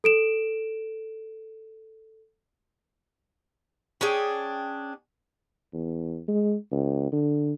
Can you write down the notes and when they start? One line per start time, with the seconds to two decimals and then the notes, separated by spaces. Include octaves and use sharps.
0.04 A4 D7 E7
4.01 C#4 D4 G#4 G5
5.74 E2
6.28 G#3
6.72 C#2
7.12 D3